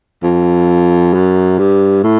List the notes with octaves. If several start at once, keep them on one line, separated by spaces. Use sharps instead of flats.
F2
F#2
G2
A2